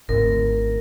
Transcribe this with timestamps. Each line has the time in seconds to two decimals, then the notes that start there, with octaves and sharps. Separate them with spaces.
0.09 G#1 D2 A#4